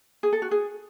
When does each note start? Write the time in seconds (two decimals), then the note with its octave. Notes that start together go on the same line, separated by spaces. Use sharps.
0.23 G#4
0.33 A4
0.42 F#4
0.51 G#4